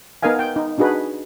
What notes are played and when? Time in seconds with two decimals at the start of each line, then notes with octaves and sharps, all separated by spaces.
0.22 B3 D#4 A#4 D#5 F5 G#5
0.39 G5
0.56 D#4
0.78 D4 D#4 F#4 G#4 B4